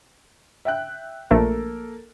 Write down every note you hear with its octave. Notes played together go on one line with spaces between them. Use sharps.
E5 G5 F#6
A#1 A3 A#3 A4 A#4